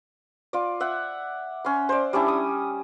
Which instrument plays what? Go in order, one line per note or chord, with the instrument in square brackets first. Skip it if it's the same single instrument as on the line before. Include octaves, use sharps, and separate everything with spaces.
[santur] F4 D5
E5 F#5
C#4 C6
C5 D5
G3 C#4 D4 E4
D#6